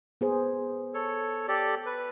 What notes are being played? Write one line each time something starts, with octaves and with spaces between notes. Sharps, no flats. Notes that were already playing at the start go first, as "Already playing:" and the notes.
B3 G#4 C5
A4 C#5
G4 A4 D5
B4